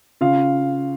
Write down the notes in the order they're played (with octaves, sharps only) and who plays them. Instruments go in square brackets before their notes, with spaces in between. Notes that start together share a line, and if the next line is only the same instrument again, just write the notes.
[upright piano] C#3 F4 F5